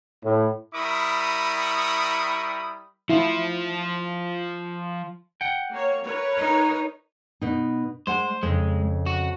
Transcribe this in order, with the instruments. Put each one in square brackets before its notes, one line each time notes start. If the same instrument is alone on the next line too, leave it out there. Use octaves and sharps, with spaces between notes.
[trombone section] A2
[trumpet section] G3 E4 A#4 B5 C#6 D#6
[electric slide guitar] F3 F4 [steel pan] E4
[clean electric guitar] F#5 G5
[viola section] A#3 C#5
A#4 B4 C#5
[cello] D#4
[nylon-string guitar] B2 D#4
[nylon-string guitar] G#3 F#5 G#5 [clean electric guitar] C5
[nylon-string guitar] F2 C#3 [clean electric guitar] G#3
[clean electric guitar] F#4